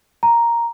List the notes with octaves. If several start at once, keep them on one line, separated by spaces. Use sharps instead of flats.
A#5